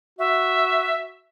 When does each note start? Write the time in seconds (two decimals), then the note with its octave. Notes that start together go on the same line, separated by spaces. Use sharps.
0.19 F#4 E5